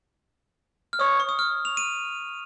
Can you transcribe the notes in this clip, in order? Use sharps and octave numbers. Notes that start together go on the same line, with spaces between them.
F6
C#5 D#6
C#6
D#6
F6
F7
D#7